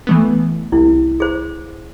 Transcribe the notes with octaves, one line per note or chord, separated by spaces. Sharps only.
E3 A3 B3
C2 E4
G#4 C5